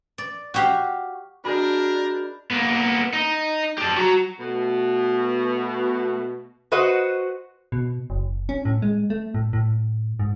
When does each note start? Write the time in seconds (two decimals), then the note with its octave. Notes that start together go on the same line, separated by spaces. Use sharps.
0.18 D5
0.54 F#4 G4 F5
1.45 D4 F#4 G#4 A#4 D#5 B5 G6
2.51 A#3 B3
3.13 D#4
3.78 G4 A5
3.97 F#4 A#5
4.39 B2 A3
6.72 F#4 B4 C5 D#5 F#5
7.72 B2
8.10 F#1
8.49 C#4
8.65 A2
8.82 G#3
9.10 A3
9.34 A2
9.53 A2
10.19 G#2